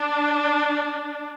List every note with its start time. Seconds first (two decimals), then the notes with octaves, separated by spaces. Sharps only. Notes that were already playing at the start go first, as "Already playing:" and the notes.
Already playing: D4